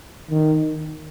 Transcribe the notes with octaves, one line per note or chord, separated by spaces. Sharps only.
D#3